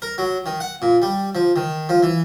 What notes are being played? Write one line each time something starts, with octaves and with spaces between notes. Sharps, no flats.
A#4
F#3
D#3
F#5
A#2
G3
F3
D#3
F3
E3